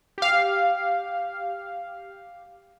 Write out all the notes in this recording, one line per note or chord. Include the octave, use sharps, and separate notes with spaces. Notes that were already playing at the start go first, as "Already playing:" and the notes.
G4 F5